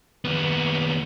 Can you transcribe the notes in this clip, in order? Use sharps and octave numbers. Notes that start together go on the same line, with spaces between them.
D#2 B3